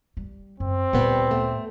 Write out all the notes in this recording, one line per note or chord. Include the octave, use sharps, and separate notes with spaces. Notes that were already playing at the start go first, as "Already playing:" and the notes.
G3
F#2 C4
D2 A#2 G3 B3
A3